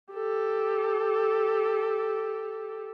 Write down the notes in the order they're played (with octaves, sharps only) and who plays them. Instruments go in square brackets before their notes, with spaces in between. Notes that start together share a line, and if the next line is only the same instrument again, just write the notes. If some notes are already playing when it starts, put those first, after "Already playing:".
[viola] G4 A4